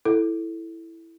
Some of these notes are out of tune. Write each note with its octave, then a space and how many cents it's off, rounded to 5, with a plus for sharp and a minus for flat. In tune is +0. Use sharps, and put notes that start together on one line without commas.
E4 +0 A4 +0